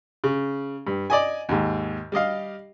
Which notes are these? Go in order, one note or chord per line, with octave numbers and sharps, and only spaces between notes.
C#3
G2
D5 D#5 G#5
D#2 G#2
G3 G4 D#5 F5